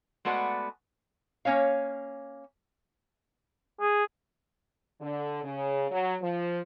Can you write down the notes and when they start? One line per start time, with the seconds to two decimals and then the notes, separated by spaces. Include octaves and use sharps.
0.25 G#3 A3 B3 F#4 D5 F#5
1.45 A#3 C#4 C#5 F5
3.81 G#4
5.01 D3
5.43 C#3
5.91 F#3
6.21 F3